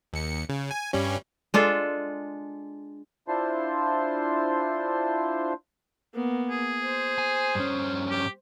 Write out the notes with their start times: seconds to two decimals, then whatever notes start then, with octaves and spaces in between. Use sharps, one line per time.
0.13 D#2 C#7
0.49 C#3
0.71 G#5
0.93 G2 G3 C#4
1.54 G#3 D4 F4 A4
3.28 D4 E4 F4 C5 A5 C6
6.14 A#3 B3
6.50 G#4
6.84 C5
7.18 G#5
7.55 G2 C#4
8.10 G4